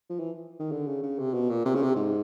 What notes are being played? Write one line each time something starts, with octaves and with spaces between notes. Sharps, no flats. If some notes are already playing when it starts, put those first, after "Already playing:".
F3
E3
D#3
D3
C#3
C#3
C3
B2
A#2
C3
C#3
C3
G#2